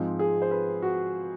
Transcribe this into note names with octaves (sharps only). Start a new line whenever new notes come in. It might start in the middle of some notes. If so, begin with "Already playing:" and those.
Already playing: G#2 F3 G#3 C4
G#4
C5
B4
F#4